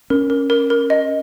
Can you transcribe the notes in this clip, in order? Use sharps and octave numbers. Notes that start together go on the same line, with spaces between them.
C#4 A#4
A#4
A#4
A#4
D#5